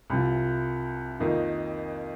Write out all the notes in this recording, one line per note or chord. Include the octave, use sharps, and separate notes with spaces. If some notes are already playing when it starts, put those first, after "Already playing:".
C2 C3 F3
F2 D#3 A#3 D#4